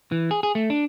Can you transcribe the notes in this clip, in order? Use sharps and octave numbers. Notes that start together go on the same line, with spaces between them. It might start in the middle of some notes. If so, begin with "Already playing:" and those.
E3
G#4
G#4
A3
D4